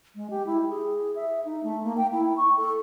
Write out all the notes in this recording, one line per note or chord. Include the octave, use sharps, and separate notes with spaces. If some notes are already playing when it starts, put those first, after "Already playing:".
G#3
G4
E4
G#4
E5
D#4
A3
A#3
G5
E4
C#6
A4